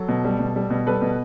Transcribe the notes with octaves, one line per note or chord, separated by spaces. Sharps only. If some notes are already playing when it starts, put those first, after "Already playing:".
Already playing: F#3 A4
B2
G3
B2
G3
B2
G3 A4 B4
B2